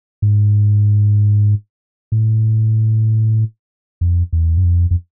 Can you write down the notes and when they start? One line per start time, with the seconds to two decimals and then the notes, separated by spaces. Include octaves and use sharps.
0.22 G#2
2.12 A2
4.01 F2
4.33 E2
4.57 F#2
4.64 F2
4.91 F2